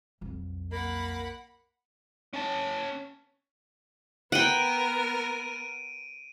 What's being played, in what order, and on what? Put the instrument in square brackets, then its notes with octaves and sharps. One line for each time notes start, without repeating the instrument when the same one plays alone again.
[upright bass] B1 F2
[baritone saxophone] A#3 [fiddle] F#5 B5
[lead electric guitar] C#4 A5
[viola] B3 A#4 [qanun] F#5 G5 [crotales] D7 D#7